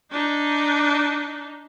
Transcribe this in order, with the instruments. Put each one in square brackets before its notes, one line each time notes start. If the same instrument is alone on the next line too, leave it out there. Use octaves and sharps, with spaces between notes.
[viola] D4 D#4